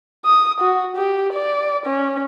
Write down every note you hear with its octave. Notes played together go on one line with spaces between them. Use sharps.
D#6
F#4
G4
D5
C#4